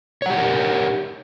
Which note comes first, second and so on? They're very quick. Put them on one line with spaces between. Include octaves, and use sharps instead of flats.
C#5 F#5 G4 C5 A#4